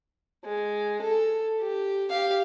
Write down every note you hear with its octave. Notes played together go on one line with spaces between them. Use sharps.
G#3
A4
G4
G4 F5